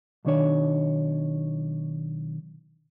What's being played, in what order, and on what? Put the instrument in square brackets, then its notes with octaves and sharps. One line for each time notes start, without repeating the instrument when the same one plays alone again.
[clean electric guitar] B1 D#3 D4 C#5